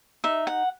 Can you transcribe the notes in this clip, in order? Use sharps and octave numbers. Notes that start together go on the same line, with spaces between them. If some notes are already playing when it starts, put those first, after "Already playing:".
D#4 E5
F#5